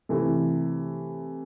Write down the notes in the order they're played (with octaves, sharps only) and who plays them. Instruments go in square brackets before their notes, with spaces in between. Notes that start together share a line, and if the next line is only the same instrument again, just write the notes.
[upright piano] C3 E3 A3